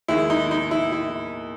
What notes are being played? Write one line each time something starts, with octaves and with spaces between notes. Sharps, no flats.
D#2 D#3 G#3 E4
D#4
D#4
E4
E4